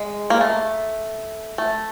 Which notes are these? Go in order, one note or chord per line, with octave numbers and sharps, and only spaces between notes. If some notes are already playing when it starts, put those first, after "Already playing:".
Already playing: G#3
A#3
A3
A3